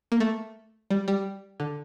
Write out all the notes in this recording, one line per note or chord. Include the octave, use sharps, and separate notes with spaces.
A#3
A3
G3
G3
D3